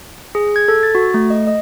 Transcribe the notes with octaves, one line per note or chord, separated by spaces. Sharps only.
G#4
G#6
A4
A6
F#4
A3
D#5
D#5